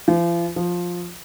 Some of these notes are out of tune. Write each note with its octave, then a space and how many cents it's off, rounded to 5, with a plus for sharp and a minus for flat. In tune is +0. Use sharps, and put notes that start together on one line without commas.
F3 -40
F3 +10